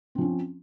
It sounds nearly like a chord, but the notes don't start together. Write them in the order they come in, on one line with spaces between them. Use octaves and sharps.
C4 F3 C#4